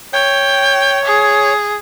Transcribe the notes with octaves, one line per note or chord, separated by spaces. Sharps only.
C#5 G5
G#4